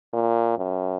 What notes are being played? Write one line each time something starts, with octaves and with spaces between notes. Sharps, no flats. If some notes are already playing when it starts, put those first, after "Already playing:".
A#2
F#2